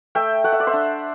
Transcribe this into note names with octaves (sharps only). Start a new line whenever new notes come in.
A3 E5 G5
A3 F#5
E5
D5
C5 E5
D4